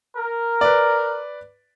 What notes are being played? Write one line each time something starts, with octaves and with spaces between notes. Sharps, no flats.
A#4
B4 D5